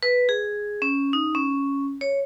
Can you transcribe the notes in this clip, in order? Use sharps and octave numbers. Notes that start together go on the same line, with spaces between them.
B4
G#4
C#4
D#4
C#4
C#5